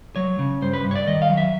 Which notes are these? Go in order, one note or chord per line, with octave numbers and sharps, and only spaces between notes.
F#3 C#5
C#3
G2 C5
B4
G2
C#5
D5
D#3 D#5
F5
F#3
E5